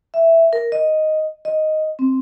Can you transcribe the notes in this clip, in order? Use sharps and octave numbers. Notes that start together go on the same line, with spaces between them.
E5
A#4
D#5
D#5
C4